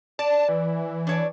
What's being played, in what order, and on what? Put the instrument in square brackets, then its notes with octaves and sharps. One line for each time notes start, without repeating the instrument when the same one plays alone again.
[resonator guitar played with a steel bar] D5 [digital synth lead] A5
[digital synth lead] E3
[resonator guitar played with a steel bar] D4 C#5 D5